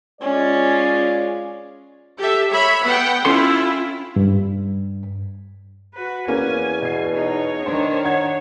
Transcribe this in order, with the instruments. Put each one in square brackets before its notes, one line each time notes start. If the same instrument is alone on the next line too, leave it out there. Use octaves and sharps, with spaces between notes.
[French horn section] G#3 F4 D5 [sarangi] C#4
[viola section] G4 A4 E5
C#5 E5 B5
B3 F#5 G5
[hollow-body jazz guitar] C#4 A4 C6 [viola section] E4 F4
[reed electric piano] G2
[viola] F#4 B4
[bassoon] E2 [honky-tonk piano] A#3 C#4 [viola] G#5
[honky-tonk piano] B2 C7
[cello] D#4 [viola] C#5
[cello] D#3 D4 [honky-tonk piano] C5
[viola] C#5 [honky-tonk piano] F#5 G#6